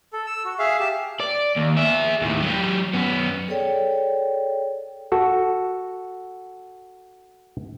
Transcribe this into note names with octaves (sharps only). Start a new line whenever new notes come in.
A4
E6
F#4
G#4 E5 F5
G4 A5
D5
D#2
G#4 E5
D#2 A2
F#3 G4
F#2 B3
G#4 A4 C#5 D5 G5
F#4 A4